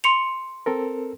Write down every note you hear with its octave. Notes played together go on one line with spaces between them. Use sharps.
C6 C#7 F7
C4 A4 A#4